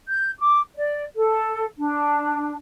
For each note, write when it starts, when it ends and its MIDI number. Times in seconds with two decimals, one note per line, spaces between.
0.08 0.31 91
0.40 0.61 86
0.75 1.04 74
1.17 1.65 69
1.78 2.56 62